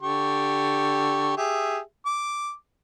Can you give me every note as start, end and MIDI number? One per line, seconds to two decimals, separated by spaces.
0.02 1.36 50
0.02 1.36 67
0.02 1.36 85
1.37 1.80 67
1.37 1.80 68
1.37 1.80 76
2.06 2.54 86